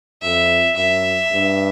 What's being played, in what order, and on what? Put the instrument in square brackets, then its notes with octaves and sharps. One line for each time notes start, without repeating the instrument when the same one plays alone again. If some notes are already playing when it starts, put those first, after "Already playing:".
[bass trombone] F2 [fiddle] E5
[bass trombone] F#2 [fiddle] E5
[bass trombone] G2